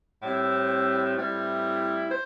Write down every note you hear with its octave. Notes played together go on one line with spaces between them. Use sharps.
A2 G3 C4 E4
A2 G3 C4 E4
C5